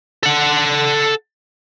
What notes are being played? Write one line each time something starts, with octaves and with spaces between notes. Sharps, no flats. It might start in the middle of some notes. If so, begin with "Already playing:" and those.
A4 F#5